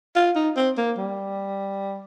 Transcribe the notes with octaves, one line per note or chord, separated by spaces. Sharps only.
F4
D#4
C4
A#3
G3